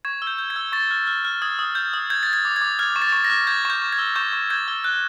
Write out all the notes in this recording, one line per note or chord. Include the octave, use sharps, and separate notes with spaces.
C#6 G#6
E6
G6
G6
G#6
E6
C#6 A6
F6
F6
F6
D#6 G#6
D#6
G6
D#6
G6 G#6
G6 A6
G#6
D6
G#6
D6
F6 G#6
C#6
A6
C#6
A#6
F6
G6 G#6
C#6 G6
C#6
G#6
E6
C#6 G6
C#6
G6 G#6
E6
F#6